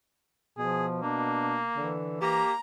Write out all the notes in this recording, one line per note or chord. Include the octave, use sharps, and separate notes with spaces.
B2 F3 G#4
A#3 D4
D3 E3
A#3 G4 A#5